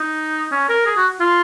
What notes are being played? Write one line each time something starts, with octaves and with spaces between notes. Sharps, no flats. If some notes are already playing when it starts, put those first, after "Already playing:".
Already playing: D#4
C#4
A#4
G#4
F#4
F4